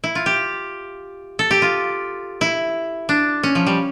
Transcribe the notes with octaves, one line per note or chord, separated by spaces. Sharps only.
E4
F4
G4
A4
G4
F4
E4
D4
C#4
F3
G3